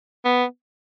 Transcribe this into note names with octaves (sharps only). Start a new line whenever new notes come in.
B3